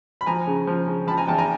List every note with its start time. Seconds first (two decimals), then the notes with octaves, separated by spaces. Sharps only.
0.21 B5
0.26 F3 G#5 A#5
0.47 C#3
0.67 F3
0.88 C#3
1.07 F3 A5 B5
1.17 G#5 A#5
1.27 E2 G5 A5
1.38 G#5 A#5